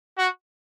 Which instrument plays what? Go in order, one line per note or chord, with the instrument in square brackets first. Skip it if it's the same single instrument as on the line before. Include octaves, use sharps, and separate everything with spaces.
[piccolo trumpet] F#4